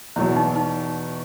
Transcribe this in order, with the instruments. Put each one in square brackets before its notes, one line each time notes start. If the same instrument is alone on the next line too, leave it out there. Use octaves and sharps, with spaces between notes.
[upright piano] E2 B2 F#3 [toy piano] E4
[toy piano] D#4
D#4